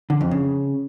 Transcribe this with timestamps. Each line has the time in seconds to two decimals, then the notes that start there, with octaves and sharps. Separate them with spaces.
0.10 D3
0.21 F2
0.31 C#3